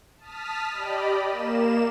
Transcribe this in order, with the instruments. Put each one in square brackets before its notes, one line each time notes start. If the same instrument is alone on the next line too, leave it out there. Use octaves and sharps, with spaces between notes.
[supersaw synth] A5 D#6 F6 B6
G4 D5 D#5 B5
A#3 E7